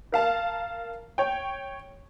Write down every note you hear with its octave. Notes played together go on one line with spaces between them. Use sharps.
A#4 F5 A5
C#5 G5